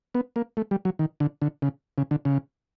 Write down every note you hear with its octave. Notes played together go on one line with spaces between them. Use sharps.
B3
A#3
A3
G3
F#3
D#3
D3
D3
C#3
C#3
D3
C#3